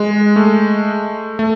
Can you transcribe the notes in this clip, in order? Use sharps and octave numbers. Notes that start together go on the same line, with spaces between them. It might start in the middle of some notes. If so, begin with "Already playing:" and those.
Already playing: G#3
A3
A3